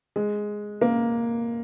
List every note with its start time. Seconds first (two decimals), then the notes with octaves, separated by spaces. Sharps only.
0.16 G#3
0.81 A#3